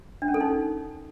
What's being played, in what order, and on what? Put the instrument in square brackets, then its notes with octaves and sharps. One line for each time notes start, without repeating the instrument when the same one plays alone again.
[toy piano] D4
C#4
A4
D#4